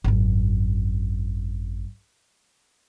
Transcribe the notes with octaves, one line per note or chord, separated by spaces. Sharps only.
G#1 F#2